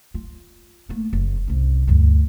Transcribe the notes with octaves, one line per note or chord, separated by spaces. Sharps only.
F4
A3 A#3
F#1
C2 C#4
D2 G2